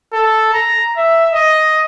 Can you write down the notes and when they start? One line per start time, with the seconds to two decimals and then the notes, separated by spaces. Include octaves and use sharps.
0.13 A4
0.53 A#5
0.97 E5
1.33 D#5